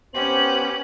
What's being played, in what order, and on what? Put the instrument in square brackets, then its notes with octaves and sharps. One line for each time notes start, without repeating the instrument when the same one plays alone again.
[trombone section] B3 C5 [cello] C#4 [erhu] G4 [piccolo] F#7